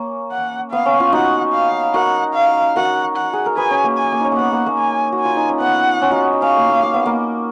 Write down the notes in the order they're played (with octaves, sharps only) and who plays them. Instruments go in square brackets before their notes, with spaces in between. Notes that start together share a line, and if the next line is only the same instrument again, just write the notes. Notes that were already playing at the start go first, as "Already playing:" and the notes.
Already playing: [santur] A#3 C#4
[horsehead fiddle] F#5
[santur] B3 [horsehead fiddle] F5
[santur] C#4
C#4 F4
[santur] D#4 F#4 [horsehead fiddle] F#5
[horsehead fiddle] F5
[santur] F#4 A#4 [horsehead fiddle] F#5
[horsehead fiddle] F5
[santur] F#4 A#4 [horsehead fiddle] F#5
[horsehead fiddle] F#5
[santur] G#4
A#4
[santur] G#4 B4 [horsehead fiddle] G#5
[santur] C#4
A#3
[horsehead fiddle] G#5
[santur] A#3
C#4 D#4
A#3
[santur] B3 [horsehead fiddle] F#5
[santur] A#3
A#3
[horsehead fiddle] G#5
[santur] F#4
[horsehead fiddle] G#5
[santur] F4
D#4
C#4
[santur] B3 [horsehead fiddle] F#5
[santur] C#4 F4
D#4 F#4
D#4
[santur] C#4 [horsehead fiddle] F5
[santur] A#3
A#3
A#3
B3
A#3